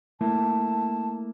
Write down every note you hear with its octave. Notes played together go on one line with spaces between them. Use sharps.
A3 A#3 E4 A5